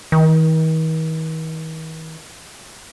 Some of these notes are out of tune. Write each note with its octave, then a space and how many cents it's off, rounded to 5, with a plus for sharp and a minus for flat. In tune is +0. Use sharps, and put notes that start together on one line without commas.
D#3 +45